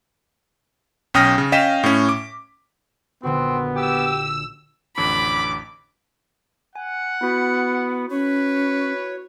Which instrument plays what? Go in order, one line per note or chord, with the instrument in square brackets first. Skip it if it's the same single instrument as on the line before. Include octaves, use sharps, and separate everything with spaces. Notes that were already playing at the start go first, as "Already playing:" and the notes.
[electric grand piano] B1 C#4 G5 D#6 F6 A#6
C#3
C#4 D#5 F5 G5 B6 E7
A2 C#4
D6
[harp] A#1 D3 F#4 [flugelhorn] B3 [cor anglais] C4
[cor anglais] G4 [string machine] E6
[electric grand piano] A1 F2 D3 [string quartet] B5 [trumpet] D6
[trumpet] F#5 [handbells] G#5
[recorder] B3 [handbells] E4 F#4
[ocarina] C#4 [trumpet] B4 [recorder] C#5